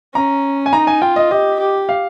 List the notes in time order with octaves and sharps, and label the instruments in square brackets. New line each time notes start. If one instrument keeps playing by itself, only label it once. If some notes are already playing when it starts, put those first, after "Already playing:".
[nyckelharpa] C#4 [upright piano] A#5
[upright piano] G#5
[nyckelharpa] D#4 [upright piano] A#5
[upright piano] G#5
[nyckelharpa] F4 [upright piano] G5
[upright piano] D#5
[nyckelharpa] G4 [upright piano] D#5
[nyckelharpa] G4
[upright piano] F5